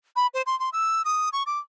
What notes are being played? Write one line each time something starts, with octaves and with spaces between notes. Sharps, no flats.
B5
C5
C6
C6
E6
D#6
C#6
D6